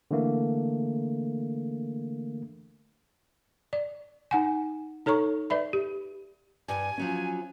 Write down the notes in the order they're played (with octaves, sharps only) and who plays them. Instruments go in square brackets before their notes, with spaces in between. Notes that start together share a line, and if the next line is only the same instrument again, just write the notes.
[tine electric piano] D3 E3 A3 A#3
[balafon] D5
D#4 F#5 G#5
D#4 A4 C#5 A#5 C#6
B4 D5 E5 B5
G4
[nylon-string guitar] G2 G3 [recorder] G#5
[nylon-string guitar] F3 F#3 C#4